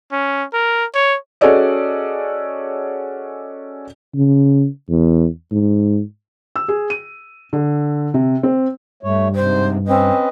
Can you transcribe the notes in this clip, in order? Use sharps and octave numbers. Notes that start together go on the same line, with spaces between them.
C#4
A#4
C#5
C#4 F#4 G#4 A4 D5 D#5
C#3
E2
G#2
E6
G#4
D#7
D3
C3
C4
G2 A3 C#5
G#2 C3 C5
C4 C#4 B4 D#5